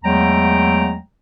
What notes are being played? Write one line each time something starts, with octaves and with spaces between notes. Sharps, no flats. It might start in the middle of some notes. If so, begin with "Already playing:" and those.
E2 F#3 G#3 A3 G5 A#5